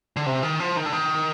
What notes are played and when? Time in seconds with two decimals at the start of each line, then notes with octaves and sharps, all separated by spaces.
0.16 D3
0.26 C3
0.43 D#3
0.60 F3
0.77 D#3
0.86 D3
0.92 D#3